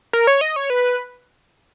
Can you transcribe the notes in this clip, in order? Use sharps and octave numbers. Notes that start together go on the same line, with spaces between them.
A#4
C#5
D#5
C#5
B4